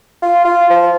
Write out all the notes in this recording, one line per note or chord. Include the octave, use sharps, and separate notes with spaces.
F4
F4
F3